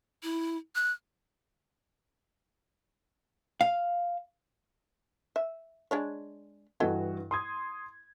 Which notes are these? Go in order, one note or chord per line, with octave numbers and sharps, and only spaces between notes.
E4
F#6
F5
E5
G#3 D4 C#5
G2 E3 E4 F#4 A4 D#5
C6 D#6 G#6